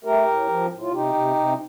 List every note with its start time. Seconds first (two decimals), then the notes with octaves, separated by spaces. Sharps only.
0.04 A3 G4 A#4
0.27 A2
0.49 F3
0.70 A2
0.81 F4
0.92 C3 D#4 G4
1.14 C3
1.36 C3